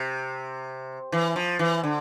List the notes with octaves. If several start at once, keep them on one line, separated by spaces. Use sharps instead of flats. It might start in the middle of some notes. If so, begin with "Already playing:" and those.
Already playing: C3
E3
F3
E3
D3